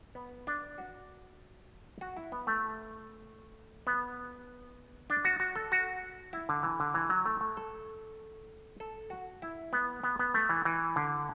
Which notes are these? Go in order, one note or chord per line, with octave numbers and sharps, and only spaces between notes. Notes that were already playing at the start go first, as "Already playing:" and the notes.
B3
D4
F#4
F#4
E4
B3
A3
B3
D4
F#4
F#4
A4
F#4
E4
D3
E3
D3
E3
F#3
A3
A3
A4
A4
F#4
E4
B3
B3
B3
A3
E3
E3
D3